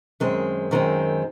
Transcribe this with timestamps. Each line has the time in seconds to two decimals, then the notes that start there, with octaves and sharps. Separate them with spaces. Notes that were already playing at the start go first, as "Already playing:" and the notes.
0.20 F#2 D#3 G#3 C4
0.71 F#2 D#3 G#3 C4